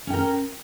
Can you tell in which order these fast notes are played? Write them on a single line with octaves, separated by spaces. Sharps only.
C#4 G5 A#4